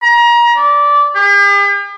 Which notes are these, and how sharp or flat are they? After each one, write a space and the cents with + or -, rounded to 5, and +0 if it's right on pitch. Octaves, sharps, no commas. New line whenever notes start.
A#5 +30
D5 -15
G4 +45